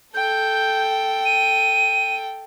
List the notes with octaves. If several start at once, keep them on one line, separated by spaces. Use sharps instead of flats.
A4 G5 G6
D#7